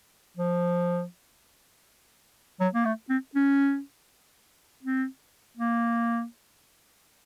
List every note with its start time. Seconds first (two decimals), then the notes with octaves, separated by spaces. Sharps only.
0.37 F3
2.60 F#3
2.74 A#3
2.85 A3
3.10 C4
3.35 C#4
4.83 C4
5.57 A#3